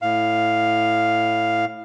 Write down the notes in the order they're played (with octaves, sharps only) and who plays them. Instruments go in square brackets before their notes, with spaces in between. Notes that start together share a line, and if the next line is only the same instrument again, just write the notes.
[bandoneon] A2 F5